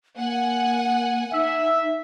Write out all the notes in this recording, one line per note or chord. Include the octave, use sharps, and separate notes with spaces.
A#3 F#5 G#5
D#4 E5